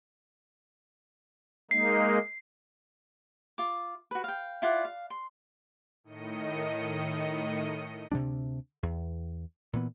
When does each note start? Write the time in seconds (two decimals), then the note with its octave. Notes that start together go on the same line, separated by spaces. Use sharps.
1.71 G#3 A#3 D#4 C7
3.58 F4 D6
4.11 F#4 B4
4.24 F5 G5
4.62 E4 F4 D5 F#5
4.85 F5
5.10 C6
6.04 A2 D#3 D#5 C#7 D#7
8.12 D2 C3 G3 D4
8.83 E2
9.73 A#2 E3 B3